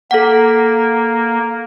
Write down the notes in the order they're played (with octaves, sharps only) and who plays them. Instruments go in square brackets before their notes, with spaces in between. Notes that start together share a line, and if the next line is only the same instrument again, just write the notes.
[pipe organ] A#3 [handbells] A4 F#5